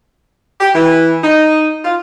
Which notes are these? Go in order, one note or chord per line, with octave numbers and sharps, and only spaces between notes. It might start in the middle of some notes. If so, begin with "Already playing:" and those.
G4
E3
D#4
F4